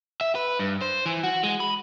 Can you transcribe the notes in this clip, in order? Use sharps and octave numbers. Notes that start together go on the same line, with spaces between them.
E5
B4
G2
C5
E3
F#4
G#3
B5